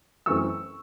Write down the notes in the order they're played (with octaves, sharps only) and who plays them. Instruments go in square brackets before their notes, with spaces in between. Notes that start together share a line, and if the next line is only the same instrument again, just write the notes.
[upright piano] F#2 E3 A3 C4 C#6 E6